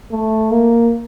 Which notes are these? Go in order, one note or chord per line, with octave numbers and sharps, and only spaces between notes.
A3
A#3